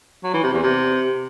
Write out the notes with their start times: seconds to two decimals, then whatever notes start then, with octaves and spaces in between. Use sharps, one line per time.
0.24 F#3
0.33 E3
0.43 C3
0.53 E2
0.63 C3